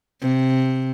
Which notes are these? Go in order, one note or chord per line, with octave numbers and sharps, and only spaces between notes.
C3